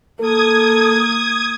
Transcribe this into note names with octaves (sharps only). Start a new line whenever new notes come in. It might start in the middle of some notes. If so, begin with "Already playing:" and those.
A#3 A4 D#6 G#6